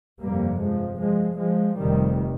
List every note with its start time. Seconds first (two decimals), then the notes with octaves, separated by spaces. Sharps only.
0.20 G1 F2 C3 G3 A#3
0.59 F3 G#3
0.99 F3 G#3
1.39 F3 G#3
1.78 F1 F2 C3 D#3 G3